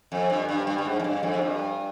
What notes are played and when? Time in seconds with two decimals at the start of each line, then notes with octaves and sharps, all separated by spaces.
0.12 F2
0.30 G2
0.49 G2
0.67 G2
0.78 G2
0.85 G#2
1.00 F2
1.04 G2
1.23 F2
1.33 G#2
1.42 G2